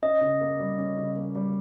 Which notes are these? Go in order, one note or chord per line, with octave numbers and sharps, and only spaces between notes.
C#4 D#5
C#3
A#3
G3
C#4
C#3
A#3
G3